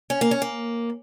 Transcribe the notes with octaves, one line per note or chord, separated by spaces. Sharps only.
C#4
A#3
C#4
A#3